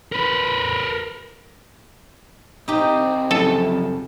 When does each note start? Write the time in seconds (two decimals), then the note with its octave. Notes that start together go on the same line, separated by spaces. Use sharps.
0.12 A#4 B4
2.68 C2 C4 D#4 G4
3.31 F#2 C#3 F3 A4